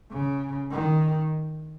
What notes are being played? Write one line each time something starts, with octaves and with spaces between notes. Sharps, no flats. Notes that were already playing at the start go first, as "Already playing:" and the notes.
C#3
D#3